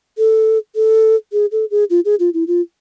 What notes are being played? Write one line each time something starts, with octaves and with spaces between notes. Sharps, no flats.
A4
A4
G#4
A4
G#4
F4
G#4
F4
E4
F4